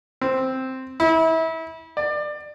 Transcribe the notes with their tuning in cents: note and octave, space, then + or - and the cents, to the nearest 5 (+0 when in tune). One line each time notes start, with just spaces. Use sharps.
C4 +0
E4 -30
D5 +25